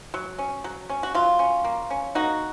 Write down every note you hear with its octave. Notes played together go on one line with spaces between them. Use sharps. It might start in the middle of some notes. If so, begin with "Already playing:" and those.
F#3
C#4
F#3
C#4
F#4
F#3 F4
C#4
A#3
C#4
A#3 D#4 F#4